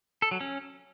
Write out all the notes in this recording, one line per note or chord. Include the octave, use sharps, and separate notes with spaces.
A4
F#3
C#4